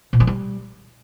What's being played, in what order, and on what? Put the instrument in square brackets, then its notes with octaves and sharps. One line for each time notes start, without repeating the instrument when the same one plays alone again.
[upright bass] A#2
F#3
G3